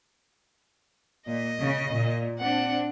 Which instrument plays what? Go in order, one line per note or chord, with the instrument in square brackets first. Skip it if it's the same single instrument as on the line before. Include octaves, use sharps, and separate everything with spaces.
[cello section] A#2 [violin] D#5
[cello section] C#3
A#2
[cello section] C4 D4 [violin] F#5